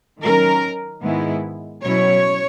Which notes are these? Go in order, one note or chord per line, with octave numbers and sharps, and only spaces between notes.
D#3 F#3 C#4 A#4
G#2 D#3 G#3 B3 E4
B2 F#3 C#4 E4 C#5